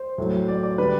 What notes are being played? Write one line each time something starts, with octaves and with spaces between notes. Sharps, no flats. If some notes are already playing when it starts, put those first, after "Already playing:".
Already playing: C5
A2 F#3 A3
D5
D5
D3 G3 B4